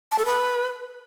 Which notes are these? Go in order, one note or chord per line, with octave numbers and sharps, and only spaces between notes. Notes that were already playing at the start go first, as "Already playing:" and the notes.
A5
A4
B4